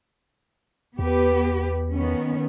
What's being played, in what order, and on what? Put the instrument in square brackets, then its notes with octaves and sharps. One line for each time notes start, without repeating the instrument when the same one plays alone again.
[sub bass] E2 [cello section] B3 G4 B4
[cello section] D#3 B3 C#4